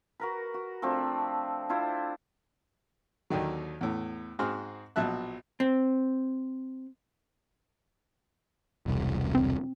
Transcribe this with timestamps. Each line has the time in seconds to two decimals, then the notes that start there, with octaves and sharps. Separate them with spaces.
0.20 F#4 A#4 B4
0.54 F#4
0.82 F3 A3 C4 D4
1.69 D4 E4 F4 C5
3.30 D#2 D3 D#3 F#3
3.81 E2 A2
4.39 G#2 C4 F#4 G#4 C6 F6
4.96 A#1 B2 F#3 E5 A5 F#6
5.60 C4
8.86 E1 C2
9.35 C4